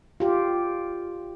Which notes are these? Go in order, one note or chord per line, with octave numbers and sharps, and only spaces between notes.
F4 G4